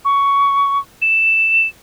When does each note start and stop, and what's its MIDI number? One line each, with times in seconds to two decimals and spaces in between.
0.05 0.79 85
1.02 1.67 100